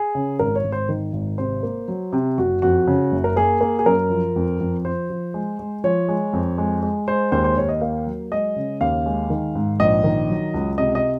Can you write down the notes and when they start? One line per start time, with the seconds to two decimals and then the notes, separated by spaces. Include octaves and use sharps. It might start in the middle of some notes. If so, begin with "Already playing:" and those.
Already playing: G#4
0.15 C#3
0.39 G#1 A#4
0.56 C#5
0.64 G#1
0.72 C5
0.89 D#3
1.13 G#1
1.38 C3 C5
1.63 A#3
1.88 F#3
2.13 C3
2.38 F#1 F#4
2.62 F2 F#4
2.88 C#3
3.12 F#1
3.24 A#4
3.36 A#3 G#4
3.61 A#3
3.79 G#4
3.86 F#2 A#4
4.10 F3
4.36 F2
4.60 F2
4.85 F3 C5
5.10 F3
5.34 G#3
5.59 G#3
5.84 F3 C#5
6.08 G#3
6.33 F2
6.58 G#3
6.83 G#3
7.08 G#3 C5
7.32 D#2 C5
7.44 C5
7.57 D#2 C#5
7.69 D#5
7.81 A#3 F5
8.07 F#3
8.31 G#3 D#5
8.56 C#3
8.81 D#2 F5
9.06 G#3
9.30 D#3
9.55 G#2
9.79 A#1 D#5
10.04 D#3
10.29 F#3
10.54 C#2
10.78 C3 D#5
10.95 D#5